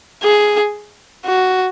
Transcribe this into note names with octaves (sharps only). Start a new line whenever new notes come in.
G#4
F#4